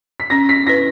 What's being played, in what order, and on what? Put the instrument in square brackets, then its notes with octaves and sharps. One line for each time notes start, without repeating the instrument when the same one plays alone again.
[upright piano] B6
[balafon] C#4 [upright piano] A#6
[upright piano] B6
[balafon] E4 B4 [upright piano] A#6